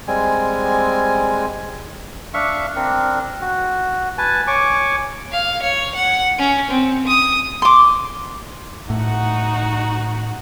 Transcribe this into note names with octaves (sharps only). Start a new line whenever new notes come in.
G3 G#3 C4 G#5
D4 E5 F5 C#6
C4 D4 A#4
F#4
B4 G#5 A5
C#5 G#5 C#6 D6
F5
C#5
F#5
C#4
C4
D#6
C6 D6
A2 D#4 F#4 F#5